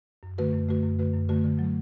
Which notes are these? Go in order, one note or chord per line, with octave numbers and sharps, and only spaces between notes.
F#2
D3 A3 F#4 B4
F#2
D3 A3 F#4 B4
F#2
D3 A3 F#4 B4
F#2
D3 A3 F#4 B4
D3
F#3 A3